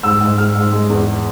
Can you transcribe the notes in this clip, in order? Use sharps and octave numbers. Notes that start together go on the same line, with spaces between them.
G#2 E6
G#2
G#2 F6
G#2
G#3
E2